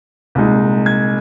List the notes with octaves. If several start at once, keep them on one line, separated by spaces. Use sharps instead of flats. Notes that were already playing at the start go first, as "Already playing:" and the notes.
C2 A#2 G#3 D#4
G#6